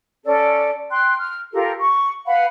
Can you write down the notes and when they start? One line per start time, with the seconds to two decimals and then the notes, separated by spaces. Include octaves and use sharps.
0.25 C#4 A4 D5
0.91 G5 C6 F#6
1.19 F6
1.52 F4 G4 A4 A#4
1.78 C#6
2.26 B4 F5 F#5 B5